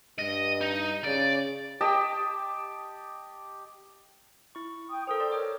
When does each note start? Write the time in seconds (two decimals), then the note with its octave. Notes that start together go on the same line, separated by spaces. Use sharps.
0.18 G2 D#5
0.61 D#4
1.04 C#3 D5
1.81 G4 D#5 G5 A5
4.55 E4 C#6
4.90 G5 D#6
5.07 A4 A#4 C5 G5 D#6
5.20 D5 C6
5.32 A#4 C#5 G5 D6